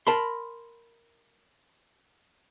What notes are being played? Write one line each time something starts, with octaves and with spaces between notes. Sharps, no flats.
A#4 A5 B5 C6